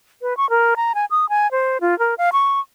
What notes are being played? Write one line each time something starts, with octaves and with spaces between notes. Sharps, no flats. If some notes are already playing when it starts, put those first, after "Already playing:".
B4
C#6
A#4
A#5
G#5
D#6
G#5
C5
F4
A#4
F5
C#6